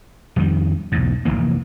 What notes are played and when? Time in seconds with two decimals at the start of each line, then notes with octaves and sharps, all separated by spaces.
0.36 F2 D#3 G3
0.92 B1 E2 G#2
1.25 F1 E2 E3 A#3